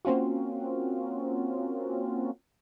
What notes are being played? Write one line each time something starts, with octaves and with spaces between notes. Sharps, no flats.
A#3 C4 C#4 F4 F#4